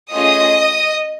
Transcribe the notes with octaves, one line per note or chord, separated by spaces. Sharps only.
A3 C#4 F4 G#4 D#5 D#6